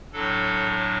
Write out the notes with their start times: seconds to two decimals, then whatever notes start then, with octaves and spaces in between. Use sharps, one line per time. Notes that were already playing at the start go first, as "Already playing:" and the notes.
0.13 A2 F#3 D4 A4